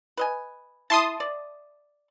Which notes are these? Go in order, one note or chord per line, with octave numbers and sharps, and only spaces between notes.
B4 D#5 G#5
E4 A5 C6 D#6
D5